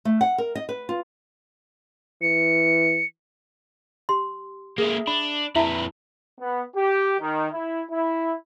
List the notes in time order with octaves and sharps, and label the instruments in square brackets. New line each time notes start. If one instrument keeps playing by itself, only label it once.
[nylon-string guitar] A3
F#5
A#4
D#5
B4
F4
[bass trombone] E3 [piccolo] C#7
[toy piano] G4 C6
[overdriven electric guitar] G#3 A#3 [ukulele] G#4 E5
[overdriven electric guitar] D4 [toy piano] B5
[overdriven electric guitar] F2 B4 [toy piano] E4 A5 [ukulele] E5
[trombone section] B3
G4
D#3
E4
E4